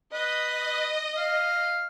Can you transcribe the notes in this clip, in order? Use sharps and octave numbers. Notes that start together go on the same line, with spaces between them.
B4 D#5
F5